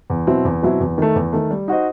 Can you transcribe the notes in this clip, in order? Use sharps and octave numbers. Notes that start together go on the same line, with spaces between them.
E2
B2 F#3 C4 E4
E2
B2 F#3 C4 E4
E2
D#3 A3
E2
D#3 A3
G3
D#4 F#4 C5 D#5